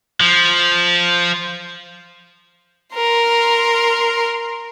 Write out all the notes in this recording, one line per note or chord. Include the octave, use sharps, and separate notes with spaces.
F3
A#4 C6